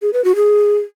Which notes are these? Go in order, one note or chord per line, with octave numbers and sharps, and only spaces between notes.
G#4
B4
F#4
G#4